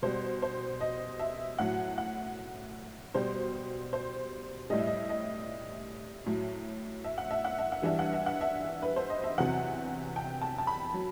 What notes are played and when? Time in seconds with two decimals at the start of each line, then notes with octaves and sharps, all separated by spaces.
0.03 B2 G3 C5
0.42 C5
0.81 D#5
1.19 E5
1.58 A2 F#3 F#5
1.98 F#5
3.15 B2 G3 C5
3.93 C5
4.70 A2 G3 D#5
4.79 E5
4.87 D#5
5.09 D#5
6.26 A2 F#3
7.04 E5
7.18 F#5
7.31 E5
7.45 F#5
7.58 E5
7.72 F#5
7.82 G2 E3 G3 E5
7.99 F#5
8.13 E5
8.26 F#5
8.41 E5
8.82 B4
8.96 C5
9.10 D#5
9.24 E5
9.38 E2 C3 F#3 F#5
10.16 G5
10.41 A5
10.58 A5
10.67 B5
10.94 F#3